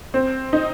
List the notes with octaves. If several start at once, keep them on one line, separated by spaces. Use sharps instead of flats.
C4
D#4